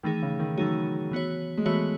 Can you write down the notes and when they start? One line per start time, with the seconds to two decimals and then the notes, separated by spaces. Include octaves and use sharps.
0.03 D#3 E3 A3 D#4 G#4
0.22 C#3
0.39 D#3
0.58 E3 F#3 A3 D#4 G#4
1.11 E3 B3 F#4 C#5
1.58 G#3
1.65 E3 A3 B3 F#4 C#5